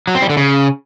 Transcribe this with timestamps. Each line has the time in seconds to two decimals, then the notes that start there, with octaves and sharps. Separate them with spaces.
0.07 F#3
0.15 C4
0.22 G3
0.30 D3
0.37 C#3